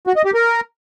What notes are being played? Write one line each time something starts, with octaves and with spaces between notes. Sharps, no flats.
F#4
D#5
G4
A#4